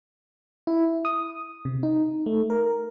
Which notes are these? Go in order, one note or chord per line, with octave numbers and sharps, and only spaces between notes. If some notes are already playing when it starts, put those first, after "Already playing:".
E4
D#6
C3
D#4
A3
A#4